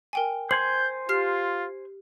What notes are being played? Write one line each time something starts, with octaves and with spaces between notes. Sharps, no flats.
A#4 G5 G#5
C5 G#5 C6 G6 F#7
F4 G4 F6 C7